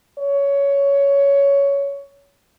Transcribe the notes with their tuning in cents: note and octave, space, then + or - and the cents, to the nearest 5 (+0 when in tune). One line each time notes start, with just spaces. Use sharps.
C#5 +15